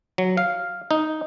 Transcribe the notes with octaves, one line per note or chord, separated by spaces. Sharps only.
F#3
F5
D#4